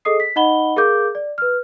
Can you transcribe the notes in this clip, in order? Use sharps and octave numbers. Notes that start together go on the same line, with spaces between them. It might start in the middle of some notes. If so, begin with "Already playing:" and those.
G#4 A4 D#5 D#6 C7
B6
D#4 D#5 F#5 B5 G7
G#4 A#4 F5 D6 G6
D5
B4 F6